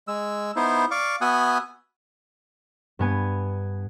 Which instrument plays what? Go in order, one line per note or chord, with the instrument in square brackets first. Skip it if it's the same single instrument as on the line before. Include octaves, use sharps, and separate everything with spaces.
[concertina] G#3 E6
B3 D#4 E4 C5
D5 F5 C#6 D6
B3 F#4 E5 G#5 D#6 F#6
[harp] G2 B3 G#5